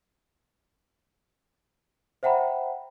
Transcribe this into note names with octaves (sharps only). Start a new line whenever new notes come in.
C5 E5 F#5 G5 A#5 B5